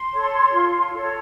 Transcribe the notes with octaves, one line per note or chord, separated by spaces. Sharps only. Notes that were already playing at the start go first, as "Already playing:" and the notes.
Already playing: C6
A4 C#5
F4
A4 C#5